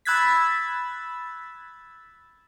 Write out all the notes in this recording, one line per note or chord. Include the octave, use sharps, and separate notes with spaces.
B5 E6 F#6 G#6 A6 B6